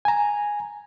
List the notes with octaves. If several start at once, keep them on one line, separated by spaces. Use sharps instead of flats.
G#5 A#5